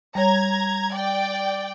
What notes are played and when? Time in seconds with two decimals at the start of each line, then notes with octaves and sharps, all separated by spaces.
0.15 G3 C#5 A#5 G#6
0.93 D5 G5